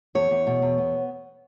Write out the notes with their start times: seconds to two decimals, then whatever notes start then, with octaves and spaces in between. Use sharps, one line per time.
0.15 E2 C#5
0.31 E2
0.47 B2
0.62 E2
0.78 B3